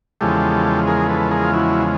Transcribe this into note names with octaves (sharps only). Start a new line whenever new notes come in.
E2 C#3 F3 G#3 G4 A4
G#4 A#4
A4 B4
G#4 A#4
F4
E4 F#4